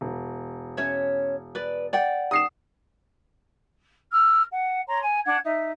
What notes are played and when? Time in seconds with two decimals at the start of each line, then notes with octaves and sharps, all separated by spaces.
0.01 E1
0.77 C#4 C#5 E5
1.55 B4 D5
1.93 D5 F#5 G5
2.31 D#6 C7 E7
4.11 E6 F6
4.50 F#5
4.86 C#5 A#5 C6
5.02 G#5
5.24 D4 F#5 G#6
5.44 D#4 E5